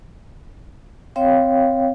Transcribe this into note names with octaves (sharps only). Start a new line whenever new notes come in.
C4 C#5 F5 G5